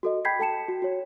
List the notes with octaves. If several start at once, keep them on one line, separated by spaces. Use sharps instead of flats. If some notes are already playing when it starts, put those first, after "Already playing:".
F#4 A4 D#5
G5 B5 G6 G#6 B6 C7
A4 G5 A5 C#7 E7
F#4
F#4 C#5